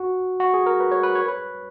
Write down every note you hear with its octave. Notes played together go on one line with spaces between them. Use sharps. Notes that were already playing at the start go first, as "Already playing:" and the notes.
Already playing: F#4
F#4
G#4
A#4
B4
C#5
B4
C#5
B4